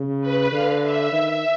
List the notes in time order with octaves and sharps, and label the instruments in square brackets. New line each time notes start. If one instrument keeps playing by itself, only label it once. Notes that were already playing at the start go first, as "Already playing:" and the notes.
Already playing: [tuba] C#3
[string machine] B4
[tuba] D3 [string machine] F5
[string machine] E5
[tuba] D#3